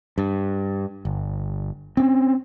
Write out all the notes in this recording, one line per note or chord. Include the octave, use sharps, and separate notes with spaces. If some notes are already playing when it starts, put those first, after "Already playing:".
G2
G1
C4 C#4